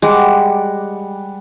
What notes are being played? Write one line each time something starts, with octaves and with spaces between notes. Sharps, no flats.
G3 G#3 F#5 D6